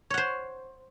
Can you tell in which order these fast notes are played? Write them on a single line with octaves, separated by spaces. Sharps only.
C#5 F#5 C5